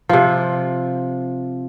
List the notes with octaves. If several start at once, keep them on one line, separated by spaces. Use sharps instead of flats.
C3 F3